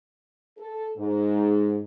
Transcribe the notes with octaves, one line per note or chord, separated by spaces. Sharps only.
A4
G#2